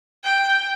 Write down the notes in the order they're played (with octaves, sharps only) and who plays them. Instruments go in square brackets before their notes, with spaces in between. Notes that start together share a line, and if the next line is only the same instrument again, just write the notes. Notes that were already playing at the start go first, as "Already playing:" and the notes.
[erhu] G5